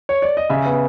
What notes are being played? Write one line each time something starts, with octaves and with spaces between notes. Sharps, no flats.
C#5
D5
D#5
C#3 E5
B3